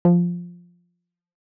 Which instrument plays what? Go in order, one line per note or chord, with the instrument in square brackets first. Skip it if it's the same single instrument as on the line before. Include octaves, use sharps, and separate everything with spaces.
[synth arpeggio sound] F3